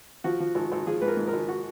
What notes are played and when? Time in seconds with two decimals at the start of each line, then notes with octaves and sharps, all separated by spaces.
0.24 F3 F#4
0.40 F3
0.55 G#1
0.72 G#1
0.87 F3 G#4
1.01 G#2 B4
1.08 A#4
1.17 G#2
1.28 A#4
1.33 G#1
1.48 F#4